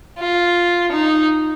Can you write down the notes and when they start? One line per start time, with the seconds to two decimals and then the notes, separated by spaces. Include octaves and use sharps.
0.19 F4
0.92 D#4